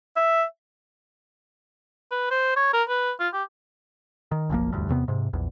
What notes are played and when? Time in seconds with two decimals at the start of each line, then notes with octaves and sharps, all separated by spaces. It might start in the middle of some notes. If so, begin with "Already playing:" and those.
0.16 E5
2.11 B4
2.31 C5
2.56 C#5
2.73 A#4
2.88 B4
3.20 F4
3.33 G4
4.32 D#3
4.49 F#1 B1 F3 A#3
4.72 E1 D2 G2
4.89 E2 C3 B3
5.08 G#2 C3
5.33 A#1 E2